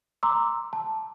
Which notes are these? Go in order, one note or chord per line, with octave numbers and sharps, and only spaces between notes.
A#5 C6 D6 E6
A5